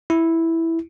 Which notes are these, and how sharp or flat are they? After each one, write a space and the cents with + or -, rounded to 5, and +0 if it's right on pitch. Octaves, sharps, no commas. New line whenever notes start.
E4 -5